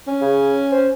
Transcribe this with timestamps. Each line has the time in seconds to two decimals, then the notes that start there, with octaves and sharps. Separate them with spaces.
0.07 C#4
0.21 C#3
0.72 C5